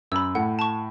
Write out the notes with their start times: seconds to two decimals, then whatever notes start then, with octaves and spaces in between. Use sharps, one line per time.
0.12 F#2 B5 E6
0.35 A2 F#5
0.59 A5 C#6